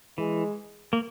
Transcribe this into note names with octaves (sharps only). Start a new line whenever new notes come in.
E3 G#3
A#3